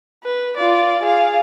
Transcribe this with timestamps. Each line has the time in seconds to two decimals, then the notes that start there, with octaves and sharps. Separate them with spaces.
0.24 B4
0.57 F4 D5
1.03 G#4 F5